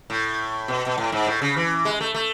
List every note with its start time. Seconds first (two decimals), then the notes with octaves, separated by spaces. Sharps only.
0.10 A2
0.68 B2
0.86 B2
0.98 A2
1.12 G#2
1.27 A2
1.42 C#3
1.57 E3
1.85 G#3
2.00 A3
2.14 A3